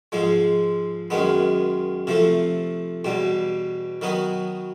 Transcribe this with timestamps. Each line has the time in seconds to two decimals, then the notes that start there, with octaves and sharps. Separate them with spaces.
0.12 G#2 F3 G#3
1.10 F#2 D#3 G#3 B3
2.07 C3 F3 A3
3.05 E2 B2 G3
4.02 D#3 F#3 B3 D#4